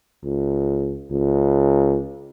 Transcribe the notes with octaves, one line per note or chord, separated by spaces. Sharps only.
C#2
C#2